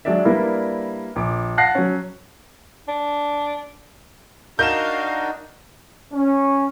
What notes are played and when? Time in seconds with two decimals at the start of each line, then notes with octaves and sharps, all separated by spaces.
0.05 F#3 G#3 D4 D5 E5
0.25 G3 A#3 D4 E4 A#4 B4
1.16 A#1 D6
1.57 F5 F#5 A5 F#6 A#6 C7
1.75 F#3 C#4
2.88 D4
4.59 D4 D#4 F#4 A#4 D#5 F5 G6 E7
6.13 C#4